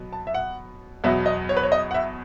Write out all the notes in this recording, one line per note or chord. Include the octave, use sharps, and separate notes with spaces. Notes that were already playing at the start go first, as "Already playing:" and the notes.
Already playing: B2 F#3 B3
A5
E5
F#5
E2 B2 F#3 B3 E5
D#5
C#5
B4
C#5
D#5
F#5
E5